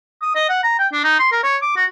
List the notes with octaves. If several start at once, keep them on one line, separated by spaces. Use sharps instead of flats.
D#6
D#5
F#5
A#5
G5
D4
D#4
C6
A#4
C#5
D6
F#4